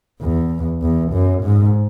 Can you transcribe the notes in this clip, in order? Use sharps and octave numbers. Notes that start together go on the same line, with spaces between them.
E2
E2
F#2
G#2